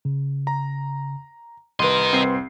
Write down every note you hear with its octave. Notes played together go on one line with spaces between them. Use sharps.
C#3
A#5
C2 A#4 B4 D#5 C6
C2 C4 C7